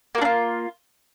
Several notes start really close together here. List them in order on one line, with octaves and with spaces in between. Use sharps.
A#3 F#4 D4 F4